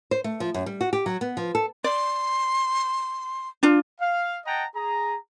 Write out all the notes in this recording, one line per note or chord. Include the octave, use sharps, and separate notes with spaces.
C5
A3
F3
F#2
G3
F#4
G4
F#3
B3
F3
A4
D5 C6
D4 F4
F5
D#5 F#5 G5 A5 A#5
G#4 A#5